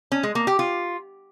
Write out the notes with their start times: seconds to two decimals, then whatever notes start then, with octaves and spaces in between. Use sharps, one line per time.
0.12 C#4
0.23 G#3
0.35 A#3
0.47 G4
0.59 F4